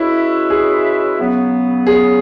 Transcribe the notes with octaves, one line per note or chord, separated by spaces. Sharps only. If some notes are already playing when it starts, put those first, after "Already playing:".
Already playing: G#3 C#4 E4 F#4 B4 E5
G#4
C#3 F#3 B3
G#4